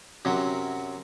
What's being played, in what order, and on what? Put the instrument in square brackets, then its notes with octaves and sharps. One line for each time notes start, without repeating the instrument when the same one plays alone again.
[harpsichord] F#2 C3 F#3